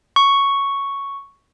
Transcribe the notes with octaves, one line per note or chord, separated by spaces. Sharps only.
C#6